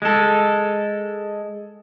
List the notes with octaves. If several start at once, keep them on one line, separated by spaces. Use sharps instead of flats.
G#3 A4